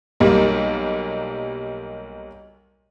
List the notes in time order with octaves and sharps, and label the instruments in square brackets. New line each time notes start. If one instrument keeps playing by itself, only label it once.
[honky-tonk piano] B1 G3 A#3